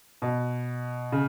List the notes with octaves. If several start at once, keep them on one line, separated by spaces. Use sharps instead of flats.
B2
C#3